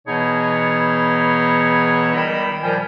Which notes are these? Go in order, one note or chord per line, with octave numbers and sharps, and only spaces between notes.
B2 E3 B3 D#4 G#4 C#5
C#2 D#3 G3 D#5 G5 B5
A#2 F3 G3 A#4 G5 G#5